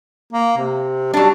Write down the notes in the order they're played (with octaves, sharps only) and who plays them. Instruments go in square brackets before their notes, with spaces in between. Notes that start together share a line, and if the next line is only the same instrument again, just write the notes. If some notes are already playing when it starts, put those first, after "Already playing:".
[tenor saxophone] A#3
C3
[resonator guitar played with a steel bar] F#3 D4 [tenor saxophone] G3